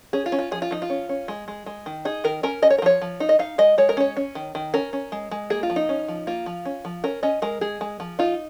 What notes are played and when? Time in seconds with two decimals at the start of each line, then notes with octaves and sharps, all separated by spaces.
0.13 C#4 G#4
0.26 F4
0.32 C#4
0.39 F4
0.51 F3 G#4
0.62 F4
0.71 F3 D#4
0.82 F4
0.90 C#4
1.09 C#4
1.28 G#3
1.48 G#3
1.66 G#3
1.86 D#3
2.05 D#4 G#4
2.24 D#3 A#4
2.43 C#4 A#4
2.62 C#4 D#5
2.70 C#5
2.78 A#4
2.82 F3 C#5
3.01 F3
3.20 D#4
3.29 D#5
3.39 D#4 F5
3.58 G#3 D#5
3.78 G#3 C#5
3.89 A#4
3.97 C#4 C#5
4.17 C#4
4.35 D#3
4.55 D#3
4.74 C#4 A#4
4.93 C#4
5.12 G#3
5.31 G#3
5.50 A#3 G#4
5.63 F4
5.70 F3
5.76 D#4
5.89 C#4
6.08 F3
6.27 A#3 F4
6.46 F3
6.65 C#4
6.85 F3
7.04 C#4 A#4
7.23 C#4 D#5
7.42 G#3 A#4
7.61 G#3 G#4
7.81 G#3
8.00 F3
8.19 D#4 F4